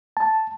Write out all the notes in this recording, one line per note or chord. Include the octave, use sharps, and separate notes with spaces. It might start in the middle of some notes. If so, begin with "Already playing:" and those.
A5